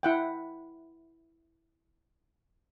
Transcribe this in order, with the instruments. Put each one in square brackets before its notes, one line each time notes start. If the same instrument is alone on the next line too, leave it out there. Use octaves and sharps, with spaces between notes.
[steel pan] E4 F#5 G5